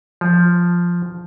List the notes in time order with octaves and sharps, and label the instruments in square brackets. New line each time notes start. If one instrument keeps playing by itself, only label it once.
[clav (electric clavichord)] F3